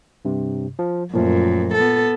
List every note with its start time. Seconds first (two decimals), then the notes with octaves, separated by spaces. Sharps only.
0.25 G2 C3
0.79 F3
1.13 G1 F#2 A#2 F3 A3
1.75 B3 A4